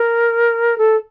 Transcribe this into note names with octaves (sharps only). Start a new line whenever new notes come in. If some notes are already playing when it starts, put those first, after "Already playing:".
Already playing: A#4
A4